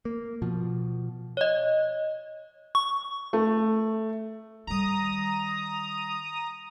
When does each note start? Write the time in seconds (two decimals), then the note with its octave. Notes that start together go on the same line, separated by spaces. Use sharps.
0.05 A#3
0.42 B2 F3
1.37 C#5 D#5
2.75 C#6
3.33 A3
4.67 D#3 G3 A#5 D#6